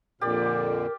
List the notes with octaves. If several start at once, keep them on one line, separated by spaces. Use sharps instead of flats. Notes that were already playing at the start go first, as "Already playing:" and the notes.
F2 A#2 D3 G4 A#4 D5